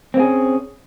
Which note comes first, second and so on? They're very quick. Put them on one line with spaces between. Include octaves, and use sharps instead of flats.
C4 A#3 G#4 C#4